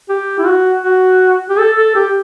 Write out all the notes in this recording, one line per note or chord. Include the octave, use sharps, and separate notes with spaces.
G4
E4
F#4
F#4
G4
A4
A4
G4